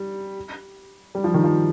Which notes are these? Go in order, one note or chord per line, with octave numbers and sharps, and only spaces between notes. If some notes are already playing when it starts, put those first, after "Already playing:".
Already playing: G3
G3
F3
D#3
F3